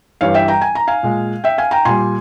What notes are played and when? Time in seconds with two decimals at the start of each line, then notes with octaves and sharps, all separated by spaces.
0.21 G2 E3 G3 C#5 F5
0.34 E5 G5
0.48 G5 A#5
0.62 G#5
0.75 A#5
0.88 F5 G#5
1.03 A#2 G#3
1.44 E5 G5
1.58 F5 G#5
1.71 G5 A#5
1.85 A#2 G3 G#5 C6